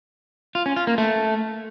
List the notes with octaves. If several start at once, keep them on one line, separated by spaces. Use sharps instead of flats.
F4
C#4
F4
A#3
A3